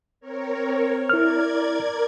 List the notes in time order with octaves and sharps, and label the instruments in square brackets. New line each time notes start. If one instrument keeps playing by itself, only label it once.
[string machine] C4 A#4 C#5
[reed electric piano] E4 F6 [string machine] A#4 D5 G#6